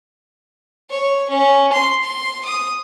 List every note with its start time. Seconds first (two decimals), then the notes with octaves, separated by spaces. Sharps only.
0.90 C#5
1.29 C#4
1.72 C6
2.03 C6
2.44 D#6